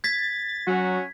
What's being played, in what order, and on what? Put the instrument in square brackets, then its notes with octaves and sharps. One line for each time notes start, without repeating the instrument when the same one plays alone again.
[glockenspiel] G#6 B6 [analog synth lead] A6
[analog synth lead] F#3 [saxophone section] C#4 F#4